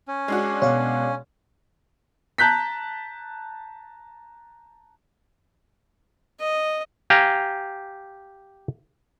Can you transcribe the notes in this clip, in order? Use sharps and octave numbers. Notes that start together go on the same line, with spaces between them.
C#4
G#3 D4 F#4
B2 C#5 F5
A5 A#5 F#6 G6 B6
D#5
G4 F5 G#5 A#5